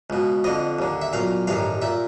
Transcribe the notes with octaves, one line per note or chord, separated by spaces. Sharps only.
C#2 B2
F2 D3 D#5
D#2 D3
E5
B1 A#2 F5
A1 G2 D#3 F5
A#2 E5